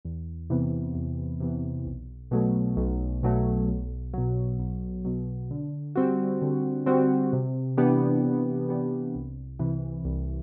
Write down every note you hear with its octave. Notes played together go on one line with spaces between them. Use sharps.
E2
C3 E3 B3
E2
C3 E3 B3
B1
B2 F#3 A3
B1
B2 F#3 A3
B1
B2 F#3
B1
B2 F#3
D3
G3 C4 F#4
D3
G3 C4 F#4
C3
E3 B3 D4 G4
C3
E3 B3 D4 G4
C2
C3 E3
C2